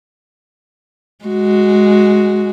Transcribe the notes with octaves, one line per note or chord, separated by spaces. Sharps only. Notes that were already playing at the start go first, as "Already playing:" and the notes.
G#3 F#4